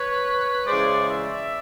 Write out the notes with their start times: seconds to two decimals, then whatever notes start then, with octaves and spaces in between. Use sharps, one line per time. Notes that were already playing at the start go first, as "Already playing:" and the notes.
Already playing: B4 C#5
0.67 C#3 E3 G#3 C5 D5
1.08 D5 E5